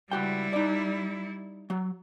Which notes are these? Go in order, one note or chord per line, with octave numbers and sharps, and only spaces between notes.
C#2 G3 E4 F#4 G5
D#4 D5
F#3